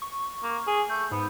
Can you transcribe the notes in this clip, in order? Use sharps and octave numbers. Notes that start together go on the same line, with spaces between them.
C#6
A#3
G#4
A3 G6
G#2 B3